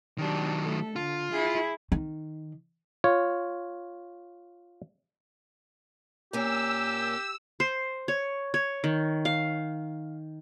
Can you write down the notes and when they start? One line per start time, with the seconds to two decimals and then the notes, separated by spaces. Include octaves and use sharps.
0.18 D#3 F#3 D4 G4
0.63 A3 A4
0.96 D3 F4
1.31 E4 G#4
1.92 D#3
3.04 F4 C#5
6.33 A#2 A#3 C#4 G4 E6
7.60 C5
8.08 C#5
8.54 C#5
8.84 D#3
9.25 F5